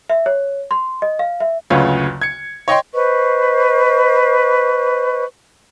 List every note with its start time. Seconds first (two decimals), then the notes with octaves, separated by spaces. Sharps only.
0.10 E5
0.26 C#5
0.71 C6
1.02 D#5
1.19 F5
1.40 E5
1.70 F#1 D2 C#3 F4 B4 C#5
2.21 G#6 C#7
2.68 C#5 D#5 G5 C6
2.93 B4 C5 D#5 C#6